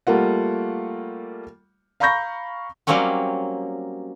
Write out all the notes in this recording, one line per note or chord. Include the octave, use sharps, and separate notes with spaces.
G3 A3 A#3 F4 F#5
F5 A#5 B5 C#6 G6 A#6
F#3 G3 A#3 C4 C#4 F#4